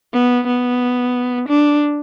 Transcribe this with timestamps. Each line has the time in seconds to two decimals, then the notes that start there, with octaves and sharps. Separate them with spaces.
0.13 B3
0.47 B3
1.49 D4